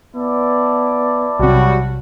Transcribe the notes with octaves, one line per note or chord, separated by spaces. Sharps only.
B3 E4 D5 A5
B1 C3 F#3 G3 F#4